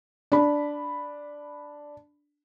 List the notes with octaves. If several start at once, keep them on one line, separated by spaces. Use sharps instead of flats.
D4 B5